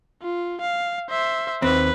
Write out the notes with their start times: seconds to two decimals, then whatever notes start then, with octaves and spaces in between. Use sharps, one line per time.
0.22 F4
0.61 F5
1.10 C5 E5
1.62 D#2 C4 B4